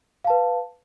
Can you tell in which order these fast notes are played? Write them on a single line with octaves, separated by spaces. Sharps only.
F5 A5 B4